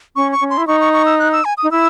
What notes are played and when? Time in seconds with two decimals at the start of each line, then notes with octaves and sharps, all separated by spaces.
0.16 C#4 C#6
0.32 C#6
0.41 C#4
0.50 C6
0.57 E4
0.67 D#4 C#6
0.81 C#6
0.93 C#6
1.06 E6
1.19 F#6
1.33 E6
1.45 G#5
1.58 D#6
1.63 D#4
1.71 E4 E6